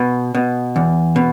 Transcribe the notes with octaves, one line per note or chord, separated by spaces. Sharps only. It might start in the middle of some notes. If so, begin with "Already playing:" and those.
Already playing: B2
B2
E2
B2